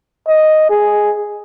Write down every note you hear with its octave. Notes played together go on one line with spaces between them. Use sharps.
D#5
G#4